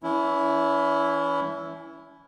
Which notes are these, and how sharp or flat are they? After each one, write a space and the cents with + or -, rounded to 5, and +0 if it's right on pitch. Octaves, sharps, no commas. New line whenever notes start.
E3 +0 C#4 +35 E4 +0